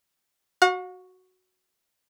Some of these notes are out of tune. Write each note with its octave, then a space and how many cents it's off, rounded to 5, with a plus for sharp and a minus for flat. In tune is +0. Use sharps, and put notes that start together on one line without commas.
F#4 +0 F#5 -45